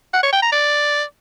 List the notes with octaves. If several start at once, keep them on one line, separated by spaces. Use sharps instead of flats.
F#5
C#5
G5
A#5
D5